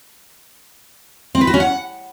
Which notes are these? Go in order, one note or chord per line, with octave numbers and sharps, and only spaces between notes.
C4
B4
F#4
C#4
F#5